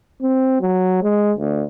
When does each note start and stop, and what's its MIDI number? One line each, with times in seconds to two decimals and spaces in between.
0.22 0.60 60
0.61 0.98 54
1.02 1.32 56
1.38 1.63 38